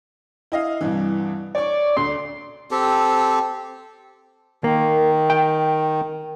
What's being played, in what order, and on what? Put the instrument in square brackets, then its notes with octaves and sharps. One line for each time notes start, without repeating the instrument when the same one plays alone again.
[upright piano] E4 D#5 F5
C2 G2 E3
[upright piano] C#5 C#6 [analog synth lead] D5
[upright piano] D2 [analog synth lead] C6
[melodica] C4 G4 A4
[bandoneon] D#3 [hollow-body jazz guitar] A#3
[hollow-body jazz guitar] G5